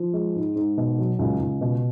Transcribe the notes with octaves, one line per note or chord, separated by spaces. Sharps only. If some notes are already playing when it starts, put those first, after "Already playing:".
Already playing: F3
G#3
G#2
G#2
B2
F#3
C#2
C#2
B2